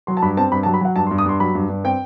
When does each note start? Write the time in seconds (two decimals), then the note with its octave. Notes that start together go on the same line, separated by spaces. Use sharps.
0.07 F#3 C6
0.17 A5
0.22 G2 B5
0.37 C4 A5
0.52 G2 B5
0.63 A5
0.66 F#3
0.74 B5
0.81 F#3 F#5
0.96 G2 A5
1.07 C6
1.11 G2
1.18 D#6
1.26 G2 C6
1.40 F#3 B5
1.55 G2
1.69 G2
1.84 C4 G5